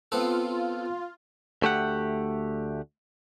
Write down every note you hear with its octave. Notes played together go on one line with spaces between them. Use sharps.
B3 C4 F4 A4
D2 A3 G4 F#5